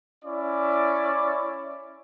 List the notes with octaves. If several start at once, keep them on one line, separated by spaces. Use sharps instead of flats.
C#4 E4 D5